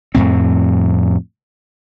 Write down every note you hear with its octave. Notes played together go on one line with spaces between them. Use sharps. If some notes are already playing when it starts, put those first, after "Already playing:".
F2 A2 C4